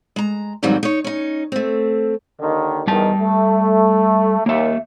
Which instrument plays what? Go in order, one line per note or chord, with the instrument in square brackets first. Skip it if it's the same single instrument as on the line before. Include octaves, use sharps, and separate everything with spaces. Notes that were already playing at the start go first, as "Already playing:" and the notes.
[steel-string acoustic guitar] G#3 A#5
F2 G#2 D#3 F#3 G3 C4
D#4 C#5
C#4 D#4
A3 C4
[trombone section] D#2 D3 D#3
[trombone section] E2 D#3 [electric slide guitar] G3 A5
[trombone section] A3
[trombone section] D#2 [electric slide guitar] A#3 E5